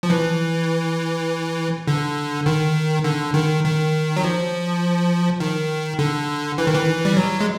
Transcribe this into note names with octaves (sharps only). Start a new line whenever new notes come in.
F3
E3
D3
D#3
D3
D#3
D#3
F#3
F3
D#3
D3
E3
D#3
E3
G3
F#3
G#3